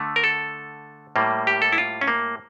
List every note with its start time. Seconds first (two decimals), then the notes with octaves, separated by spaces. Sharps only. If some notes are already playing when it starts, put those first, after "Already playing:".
Already playing: D3 A3
0.16 A#4
0.24 A4
1.16 A2 G3 A#3
1.47 G4
1.62 A4
1.72 E4
1.78 F4
2.01 C#4
2.08 A#3